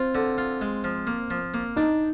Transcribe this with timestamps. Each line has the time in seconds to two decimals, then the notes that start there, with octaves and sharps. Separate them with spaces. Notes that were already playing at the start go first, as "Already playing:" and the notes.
Already playing: C4 F4
0.15 D3
0.38 F4
0.61 G#3
0.84 F3
1.07 A#3
1.30 F3
1.54 A#3
1.76 D4 D#4